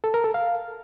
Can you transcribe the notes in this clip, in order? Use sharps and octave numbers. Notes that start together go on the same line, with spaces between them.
A4
A#4
A4
F5